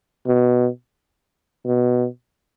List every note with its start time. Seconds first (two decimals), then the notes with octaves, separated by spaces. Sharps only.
0.27 B2
1.65 B2